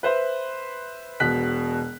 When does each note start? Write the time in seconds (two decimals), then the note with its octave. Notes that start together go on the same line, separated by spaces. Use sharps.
0.03 B4 C5 E5
1.20 E1 B2 F#6 B6